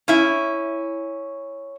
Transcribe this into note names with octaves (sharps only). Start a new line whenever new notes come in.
C#4 E4